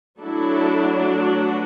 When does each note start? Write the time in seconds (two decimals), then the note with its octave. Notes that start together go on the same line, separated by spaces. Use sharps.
0.20 F#3 A3 D4 E4 A4
1.30 F#4 B4